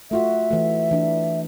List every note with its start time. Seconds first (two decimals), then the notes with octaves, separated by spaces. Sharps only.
0.11 A3 F4 F#4 E5
0.51 E3 A3
0.91 E3 D4 E4